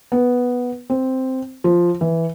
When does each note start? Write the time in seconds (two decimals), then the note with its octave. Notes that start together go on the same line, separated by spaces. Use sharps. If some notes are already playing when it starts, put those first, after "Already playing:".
0.12 B3
0.90 C4
1.64 F3
2.01 E3